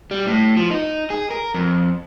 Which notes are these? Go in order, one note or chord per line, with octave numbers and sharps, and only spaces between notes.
G3
A2
F3
D#4
G#4
A#4
F2